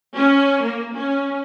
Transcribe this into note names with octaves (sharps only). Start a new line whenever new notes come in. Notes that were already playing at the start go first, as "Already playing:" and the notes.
C#4
A#3
C#4